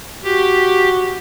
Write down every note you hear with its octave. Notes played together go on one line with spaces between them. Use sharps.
F#4 G4